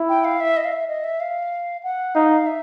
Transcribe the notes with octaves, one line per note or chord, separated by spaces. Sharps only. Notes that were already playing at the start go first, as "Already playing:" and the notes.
Already playing: E4
G5
F5
E5
D#5
F5
E5
D#5
E5
F5
F#5
D#4 F5
E5